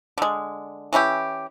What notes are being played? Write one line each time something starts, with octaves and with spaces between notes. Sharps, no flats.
D3 G#3
E3 C#4 E4 G4